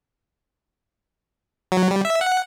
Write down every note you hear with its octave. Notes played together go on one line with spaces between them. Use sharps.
F#3
G3
E5
F#5